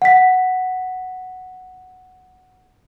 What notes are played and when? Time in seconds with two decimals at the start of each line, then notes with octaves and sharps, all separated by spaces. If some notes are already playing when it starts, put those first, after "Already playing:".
0.02 F#5 B6